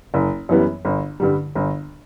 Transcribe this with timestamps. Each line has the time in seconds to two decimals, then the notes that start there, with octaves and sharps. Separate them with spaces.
0.14 F#1
0.49 F#2 E3 G3 B3
0.85 G1
1.20 G2 D3 G3
1.55 G1